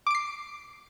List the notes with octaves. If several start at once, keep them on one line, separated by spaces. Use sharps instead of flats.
D6 C7 D7